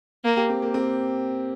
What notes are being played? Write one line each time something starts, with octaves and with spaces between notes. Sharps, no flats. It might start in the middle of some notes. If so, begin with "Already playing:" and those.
A#3
G4
C4
A#3
C4